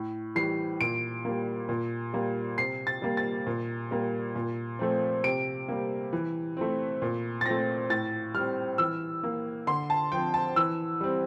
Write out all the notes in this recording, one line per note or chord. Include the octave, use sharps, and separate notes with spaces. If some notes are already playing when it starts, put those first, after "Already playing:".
Already playing: A2
E3 G3 C7
A#2 D7
G3 A#3
A#2
G3 A#3
C3 C7
A6
G3 A#3
A6
A#2
G3 A#3
A#2
F3 A3 C4
C3 D7
G3 A#3
E3
A3 C4
A#2
A6
A3 C4 A#6
A2 A6
G3 C4 F6
E3 E6
A#3
D3 C6
A5
F3 C4 G5
A5
E3 E6
G3 C4